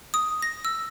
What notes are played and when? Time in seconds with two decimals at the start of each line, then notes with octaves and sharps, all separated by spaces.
0.14 D#6
0.42 A#6
0.65 E6